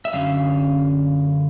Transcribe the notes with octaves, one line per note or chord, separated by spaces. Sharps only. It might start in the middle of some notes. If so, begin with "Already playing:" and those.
E5
F#2 D3 F#3 C#4 F5